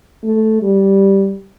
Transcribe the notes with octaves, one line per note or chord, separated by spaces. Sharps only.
A3
G3